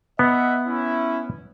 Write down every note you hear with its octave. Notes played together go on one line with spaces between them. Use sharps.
B3 D#5 E5 F#5
C#4 E4